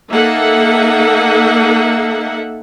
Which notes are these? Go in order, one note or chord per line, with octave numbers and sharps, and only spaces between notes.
A#3 D#4 A4 E5 F#5